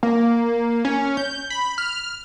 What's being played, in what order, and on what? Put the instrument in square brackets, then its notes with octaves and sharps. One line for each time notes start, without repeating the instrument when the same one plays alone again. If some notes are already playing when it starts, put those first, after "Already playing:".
[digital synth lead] A#3
C#4
G6
B5
F6